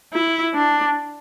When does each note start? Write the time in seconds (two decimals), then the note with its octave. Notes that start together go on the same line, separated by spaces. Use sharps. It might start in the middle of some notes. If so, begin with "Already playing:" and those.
0.13 E4
0.55 D4